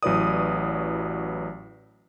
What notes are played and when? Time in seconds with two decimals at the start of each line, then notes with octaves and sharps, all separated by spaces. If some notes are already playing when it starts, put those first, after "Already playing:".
0.03 A1 F#3 E4 B4 D5 D#6